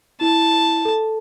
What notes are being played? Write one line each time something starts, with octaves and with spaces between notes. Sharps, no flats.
E4 A5
A4